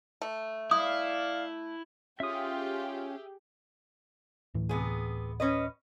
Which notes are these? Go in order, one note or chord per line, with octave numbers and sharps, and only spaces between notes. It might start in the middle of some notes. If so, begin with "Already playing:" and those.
A3
E4 D5 F5 D#6
C#4 F4 G4 G#4 E5 D#6
D1 A2 E3
C3 B3 G#4
C#4 B4 D#5